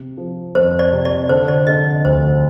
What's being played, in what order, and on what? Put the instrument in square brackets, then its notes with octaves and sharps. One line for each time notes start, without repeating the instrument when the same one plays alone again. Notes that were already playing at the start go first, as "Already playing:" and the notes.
Already playing: [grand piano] C3
F3
[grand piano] F2 [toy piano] C5
[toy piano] D5
[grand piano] C3
[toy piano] D5
[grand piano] D3 [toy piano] C5
[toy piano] D5
[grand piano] D3 [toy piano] D#5
[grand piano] D2 [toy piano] C5